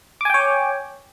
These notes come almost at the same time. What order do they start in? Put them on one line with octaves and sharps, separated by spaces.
D6 G#5 G5 C#5